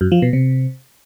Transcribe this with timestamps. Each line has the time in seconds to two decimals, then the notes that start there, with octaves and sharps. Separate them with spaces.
0.01 F#2
0.12 F3
0.22 B2
0.33 C3